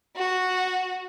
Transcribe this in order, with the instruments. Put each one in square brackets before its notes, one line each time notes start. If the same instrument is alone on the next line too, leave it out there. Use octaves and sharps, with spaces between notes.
[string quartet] F#4